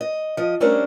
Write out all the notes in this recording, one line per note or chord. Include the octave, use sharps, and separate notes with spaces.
D#5
F3 D#5
G3 A3 C#4 D4 A#4 C5